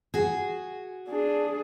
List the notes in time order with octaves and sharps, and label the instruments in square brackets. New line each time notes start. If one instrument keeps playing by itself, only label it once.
[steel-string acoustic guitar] F#4 G#4
[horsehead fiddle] D4 G#4